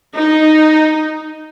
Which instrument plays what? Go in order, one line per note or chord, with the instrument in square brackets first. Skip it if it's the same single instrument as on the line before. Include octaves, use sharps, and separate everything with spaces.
[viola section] D#4